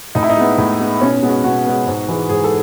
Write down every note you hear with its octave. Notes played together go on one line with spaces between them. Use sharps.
A2 D#4
E4
D#4
G#3 B3
A2
G#3 B3
B2 C#4
G#3 B3
F#4
B2 F#4
G#3 B3
G#2
E3 G#3
G#2 G#4
A4